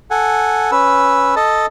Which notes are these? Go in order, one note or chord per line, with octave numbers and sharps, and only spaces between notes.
A4 F#5 G#5
C#4 B4 E6
A4 D#5 A5